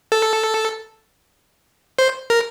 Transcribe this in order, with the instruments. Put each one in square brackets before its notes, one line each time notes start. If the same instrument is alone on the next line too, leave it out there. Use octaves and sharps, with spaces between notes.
[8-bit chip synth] A4
C5
A#4